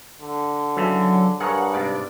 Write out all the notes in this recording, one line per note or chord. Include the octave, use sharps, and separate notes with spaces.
D3
C#3 E3 F#3 A4
G2 G#4 A#4 C#5 F#5
G#2 C3 D5